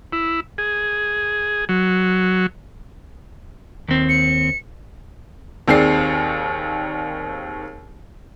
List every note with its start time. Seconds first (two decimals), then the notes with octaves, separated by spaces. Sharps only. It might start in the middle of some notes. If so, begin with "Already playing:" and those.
0.13 E4
0.58 G#4
1.69 F#3
3.88 D#2 C4
4.09 C#7
5.68 D#2 D#3 C4 G#4 D5 C7